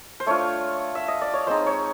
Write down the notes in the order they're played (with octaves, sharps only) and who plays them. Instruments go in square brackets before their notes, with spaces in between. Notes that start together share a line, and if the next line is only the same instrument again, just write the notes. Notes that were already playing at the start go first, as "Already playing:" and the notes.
[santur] C5
A3 D4 F4 C#5
E5
D#5
D5
C#5
G#3 C4 D#4 C5
C#5